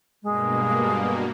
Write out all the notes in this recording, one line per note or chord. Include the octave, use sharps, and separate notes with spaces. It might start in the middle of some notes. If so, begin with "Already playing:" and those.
G2 B2 G#3 A#3